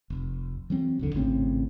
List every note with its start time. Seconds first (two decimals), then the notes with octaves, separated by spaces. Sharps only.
0.10 F1
0.70 E3 F#3 C4
0.99 E1 C#2 D3
1.15 G#1 A2 C#3 C4